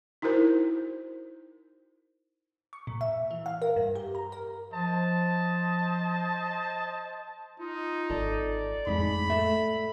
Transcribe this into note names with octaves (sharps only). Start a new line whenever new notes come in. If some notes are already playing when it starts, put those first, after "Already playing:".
D#4 E4 F#4 A#4 C5
C#6
A#2
E5
E3
F5
A#4
G2
G4
A#5
A#4
F3 C5 D#5 A5
D#4 F4
G#1 A4 D5
F2 A2 G#3 D#4 B5
A3 A4 E5